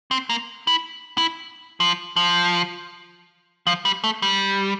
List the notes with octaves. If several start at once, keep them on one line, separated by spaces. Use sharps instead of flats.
C4
A#3
E4
E4
F3
F3
F3
G3
A3
G3